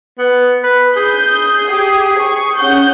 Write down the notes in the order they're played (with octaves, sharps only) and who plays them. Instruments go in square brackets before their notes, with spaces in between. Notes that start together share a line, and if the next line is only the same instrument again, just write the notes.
[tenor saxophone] B3
B4
[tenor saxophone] G#4 [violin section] G6
[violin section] G4
C#6
C#4 F#5 G6